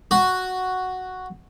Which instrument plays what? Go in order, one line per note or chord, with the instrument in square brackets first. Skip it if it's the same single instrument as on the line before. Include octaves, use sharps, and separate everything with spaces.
[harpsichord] F#4